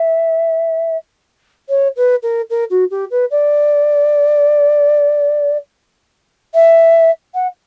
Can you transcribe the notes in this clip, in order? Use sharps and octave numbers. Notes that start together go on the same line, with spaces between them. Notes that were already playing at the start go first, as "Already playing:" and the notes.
Already playing: E5
C#5
B4
A#4
A#4
F#4
G4
B4
D5
E5
F#5